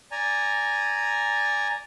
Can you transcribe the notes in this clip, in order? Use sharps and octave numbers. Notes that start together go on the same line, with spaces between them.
D5 G#5 A#5